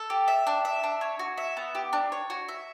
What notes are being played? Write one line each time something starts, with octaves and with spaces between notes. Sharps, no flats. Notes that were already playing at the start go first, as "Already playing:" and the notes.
Already playing: A4
G4
E5
D4
E5
D4
C#5
F#4
E5
B3
G4
D4
C#5
F#4
E5